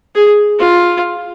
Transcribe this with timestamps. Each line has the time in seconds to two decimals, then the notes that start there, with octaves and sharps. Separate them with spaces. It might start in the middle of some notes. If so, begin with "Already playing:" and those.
0.15 G#4
0.59 F4